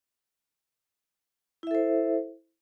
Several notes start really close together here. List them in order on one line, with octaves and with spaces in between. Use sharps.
E4 E5 A4 C5